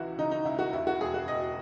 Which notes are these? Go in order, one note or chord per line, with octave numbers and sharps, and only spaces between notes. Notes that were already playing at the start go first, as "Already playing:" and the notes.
Already playing: C#2 E3 E4 F#4
C#3 D#4
D#4
C#2 E4
F#4
D#2 E4
F#4
E1 G#4
F#4
E1 D#5